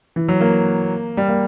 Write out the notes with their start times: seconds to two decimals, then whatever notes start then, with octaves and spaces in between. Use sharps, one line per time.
0.16 E3
0.28 F#3
0.41 A#3
1.17 G3
1.29 A#3